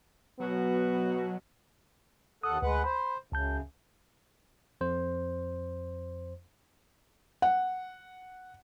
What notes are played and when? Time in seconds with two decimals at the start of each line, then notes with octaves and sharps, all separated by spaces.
0.40 B2 F#3 B3 F#4
2.44 D#2 A4 F#5 D#6
2.62 D2 G#3 B4 F#5
2.84 C5 B5
3.32 C#2 F#2 C#3 A5 G6
4.81 F2 C5
7.42 F#5